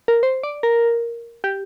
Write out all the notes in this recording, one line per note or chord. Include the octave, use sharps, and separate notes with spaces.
A#4
C5
D5
A#4
G4